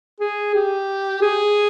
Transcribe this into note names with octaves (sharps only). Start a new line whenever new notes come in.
G#4
G4
G#4